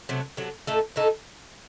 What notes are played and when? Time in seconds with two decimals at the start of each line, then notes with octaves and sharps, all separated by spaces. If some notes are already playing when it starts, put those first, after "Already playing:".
0.09 C3 F#3 A3
0.37 C3 F#3 A3
0.67 A2 A3 D#4 A4
0.96 A2 A3 D#4 A4